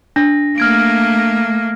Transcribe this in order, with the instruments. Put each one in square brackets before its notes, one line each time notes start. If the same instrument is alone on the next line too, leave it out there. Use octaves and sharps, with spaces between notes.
[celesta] D4 [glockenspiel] A#6
[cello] A3 A#3 [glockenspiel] F6 G#6 D7